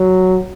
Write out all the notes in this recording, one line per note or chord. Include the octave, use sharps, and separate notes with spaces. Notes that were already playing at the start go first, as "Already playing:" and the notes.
Already playing: F#3